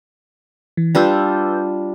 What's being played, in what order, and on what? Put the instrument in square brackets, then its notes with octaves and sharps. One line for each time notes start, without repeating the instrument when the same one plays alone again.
[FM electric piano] E3
[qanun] G3 D4 F4 [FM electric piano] B4 E6 G6